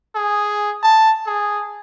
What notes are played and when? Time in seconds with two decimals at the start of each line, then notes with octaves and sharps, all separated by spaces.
0.16 G#4
0.83 A5
1.27 G#4